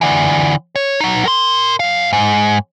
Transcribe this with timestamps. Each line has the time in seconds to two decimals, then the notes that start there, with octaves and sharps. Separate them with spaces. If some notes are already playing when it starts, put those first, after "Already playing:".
0.01 D3 E3
0.76 C#5
1.01 F#3 D#4
1.25 A#4 C6
1.80 F#2 F5
2.13 G#2